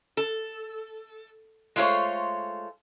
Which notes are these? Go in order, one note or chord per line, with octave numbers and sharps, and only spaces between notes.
A4
G#3 A3 F4 C5 C#5